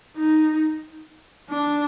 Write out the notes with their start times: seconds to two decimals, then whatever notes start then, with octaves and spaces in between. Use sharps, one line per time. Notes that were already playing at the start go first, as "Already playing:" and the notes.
0.17 D#4
1.49 D4